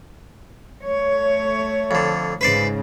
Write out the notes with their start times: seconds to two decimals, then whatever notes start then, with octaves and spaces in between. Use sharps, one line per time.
0.83 A3 C#5
1.91 F2 D3
2.41 G#2 C#3 B4 C5 D5